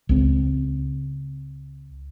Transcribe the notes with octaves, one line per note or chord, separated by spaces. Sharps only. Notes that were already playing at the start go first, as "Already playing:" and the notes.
C#2 C4